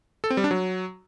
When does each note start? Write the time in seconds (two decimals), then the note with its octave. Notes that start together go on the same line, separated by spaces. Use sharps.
0.24 A4
0.30 C4
0.37 G3
0.44 D4
0.51 F#3